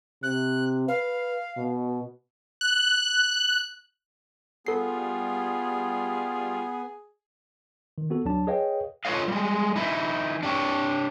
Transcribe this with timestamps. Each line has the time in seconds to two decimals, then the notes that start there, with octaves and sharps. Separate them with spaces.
0.23 C3 F#6
0.88 B4 F5
1.57 B2
2.61 F#6
4.67 G3 B3 F4 G#4 A4 C7
7.98 D#3
8.10 B3 F#4 A4
8.25 D2 F#3 D4 A5
8.47 G#4 B4 C#5 D#5 F5 G5
9.05 F4 A4 B4 C#5 D#5 F5
9.28 G3 G#3
9.76 E3 D#4 E4
10.43 D4 G4 C#5